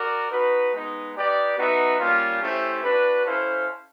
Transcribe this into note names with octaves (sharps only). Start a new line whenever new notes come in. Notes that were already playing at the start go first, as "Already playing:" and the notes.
Already playing: F#4 A#4 D5
D#4 F#4 B4
G#3 B3 D#4
D#4 G4 B4 D5
B3 D#4 F#4 B4 E5
G3 A#3 C#4 F4
A3 C#4 E4 G4 C5
D4 F#4 B4
C#4 E4 A4 C5 F5